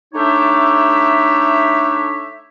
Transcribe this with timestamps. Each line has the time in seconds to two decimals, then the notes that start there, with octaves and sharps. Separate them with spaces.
0.14 A3 D4 D#4 G4 C#5 E5